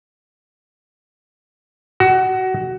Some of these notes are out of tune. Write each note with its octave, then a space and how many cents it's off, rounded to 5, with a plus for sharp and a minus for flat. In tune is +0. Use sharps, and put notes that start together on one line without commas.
F#4 +20